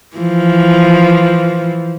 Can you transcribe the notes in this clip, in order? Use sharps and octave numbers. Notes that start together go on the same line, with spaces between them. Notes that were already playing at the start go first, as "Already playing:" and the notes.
E3 F3